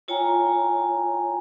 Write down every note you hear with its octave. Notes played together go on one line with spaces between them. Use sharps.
E4 F4 C#5 G5 G#5 A#5